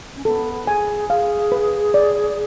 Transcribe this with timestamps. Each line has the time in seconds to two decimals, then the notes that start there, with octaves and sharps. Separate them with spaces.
0.16 C#4
0.25 B3 A4
0.67 G#4 G#5
1.09 G#4 F5
1.52 B4
1.94 D5